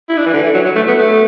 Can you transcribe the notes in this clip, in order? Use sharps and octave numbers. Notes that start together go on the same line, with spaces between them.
E4
D4
E3
D3
E3
F#3
F#3
A3
B3
A3